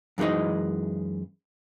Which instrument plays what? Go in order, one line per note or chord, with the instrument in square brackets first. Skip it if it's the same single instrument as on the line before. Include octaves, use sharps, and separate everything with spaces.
[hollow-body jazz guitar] F#2 E3 G#3 D#4 D#5